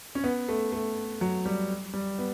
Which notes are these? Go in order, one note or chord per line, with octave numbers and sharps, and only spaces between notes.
C#4
B3
A3
A3
F#3
G3
G3
B3